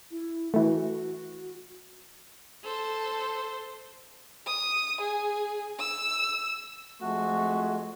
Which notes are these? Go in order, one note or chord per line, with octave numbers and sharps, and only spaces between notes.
E4
E3 A3 F#4
A4 C5
D#6
G#4
E6
F2 G#3 A3 F#4 C#6